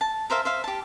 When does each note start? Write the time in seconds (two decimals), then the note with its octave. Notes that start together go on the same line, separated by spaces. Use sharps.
0.01 A5
0.30 A#4 C5 E5 F5
0.45 C5 E5 F5
0.64 G4 A5